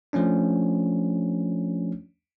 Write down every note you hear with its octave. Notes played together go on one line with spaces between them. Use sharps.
F3 A3 C#4 D4